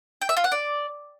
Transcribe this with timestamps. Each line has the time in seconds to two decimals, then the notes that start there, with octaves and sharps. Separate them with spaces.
0.22 G5
0.29 E5
0.37 F4
0.44 F#5
0.52 D5